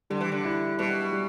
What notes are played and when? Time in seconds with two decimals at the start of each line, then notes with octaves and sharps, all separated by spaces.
0.10 D3 G3
0.21 E3
0.32 D3
0.45 E4
0.79 B2 G3
1.13 G3